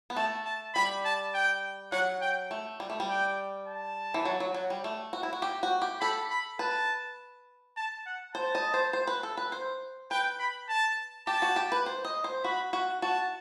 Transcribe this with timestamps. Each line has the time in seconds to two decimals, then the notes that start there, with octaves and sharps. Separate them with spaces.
0.10 B3
0.16 A3 A5
0.46 A5
0.75 G3 B5
1.05 A5
1.34 G5
1.92 F#3 F#5
2.21 G5
2.51 A3
2.80 G3
2.90 A3
3.00 G3
3.09 G5
3.68 A5
4.14 E3
4.25 F#3
4.40 F#3
4.54 F#3
4.70 G3
4.84 A3
5.13 F#4
5.23 E4
5.33 F#4
5.42 G4
5.63 F#4
5.82 G4
6.01 A4 B5
6.31 B5
6.59 B4 A5
7.77 A5
8.06 F#5
8.35 C5 A5
8.55 D#5
8.74 C5
8.93 C5
9.07 B4
9.23 A4
9.37 B4
9.52 C5
10.11 B4 G5
10.39 B5
10.69 A5
11.27 G4 A5
11.42 F#4
11.56 G4
11.72 B4
11.86 C5
12.05 D#5
12.24 C5
12.44 F#4 B5
12.73 F#4
13.02 F#4 A5